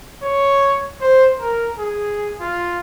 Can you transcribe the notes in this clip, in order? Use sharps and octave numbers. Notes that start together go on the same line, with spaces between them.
C#5
C5
A#4
G#4
F4